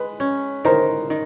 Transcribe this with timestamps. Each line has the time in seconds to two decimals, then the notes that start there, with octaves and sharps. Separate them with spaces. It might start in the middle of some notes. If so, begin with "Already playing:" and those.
Already playing: G#3 B4
0.20 C#4
0.65 D#3 A#4 C5
1.10 D#3